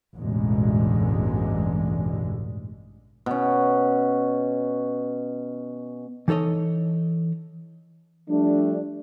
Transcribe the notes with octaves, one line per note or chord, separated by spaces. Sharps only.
A1 E2 G2 B2 D3 G#3
B2 C#4
E3 D#4 A4 C#5 D#5
F3 G3 A3 D4